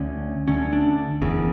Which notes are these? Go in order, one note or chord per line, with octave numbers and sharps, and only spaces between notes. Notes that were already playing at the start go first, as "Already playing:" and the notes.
Already playing: D2 D3 C#4
D2 D3 C#4
D4
F#1 E2 C#3